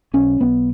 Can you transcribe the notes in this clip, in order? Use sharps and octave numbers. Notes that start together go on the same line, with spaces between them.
B1 C#4
B1 B3